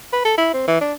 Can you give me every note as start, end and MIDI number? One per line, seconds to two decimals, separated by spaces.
0.13 0.21 71
0.25 0.33 69
0.38 0.53 64
0.53 0.67 60
0.68 0.80 52
0.81 0.93 62